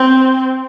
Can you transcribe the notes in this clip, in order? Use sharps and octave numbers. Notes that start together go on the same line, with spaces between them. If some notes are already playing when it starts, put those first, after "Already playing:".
Already playing: C4